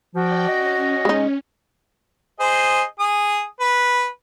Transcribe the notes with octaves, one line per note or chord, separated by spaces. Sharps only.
F3 F#4 D5 G5
C#4 D#5
G#3 D#4
G#4 C5 D#5
G#4 D#6
B4